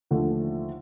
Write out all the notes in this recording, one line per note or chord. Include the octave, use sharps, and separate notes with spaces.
D#2 D3 F3 A3